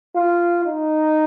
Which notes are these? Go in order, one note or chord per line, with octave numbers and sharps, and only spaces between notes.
F4
D#4